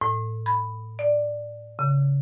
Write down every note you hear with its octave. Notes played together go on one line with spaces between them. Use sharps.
A2
B5
D5
C#3